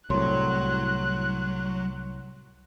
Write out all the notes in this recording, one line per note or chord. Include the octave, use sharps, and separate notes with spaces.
C2 A2 F#3 C#5 C6 F#6